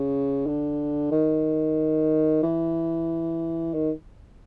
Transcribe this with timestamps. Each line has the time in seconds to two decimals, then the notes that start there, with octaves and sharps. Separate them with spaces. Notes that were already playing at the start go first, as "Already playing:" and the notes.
Already playing: C#3
0.46 D3
1.12 D#3
2.43 E3
3.74 D#3